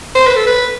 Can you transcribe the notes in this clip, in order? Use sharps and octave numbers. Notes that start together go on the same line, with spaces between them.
C5
B4
A4
B4